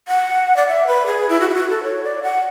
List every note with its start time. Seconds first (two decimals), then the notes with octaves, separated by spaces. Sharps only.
0.08 F#5
0.57 D5
0.68 E5
0.87 B4
1.06 G#4
1.29 E4
1.40 F#4
1.49 E4
1.55 F#4
1.70 A4
1.83 C#5
2.04 D5
2.23 F#5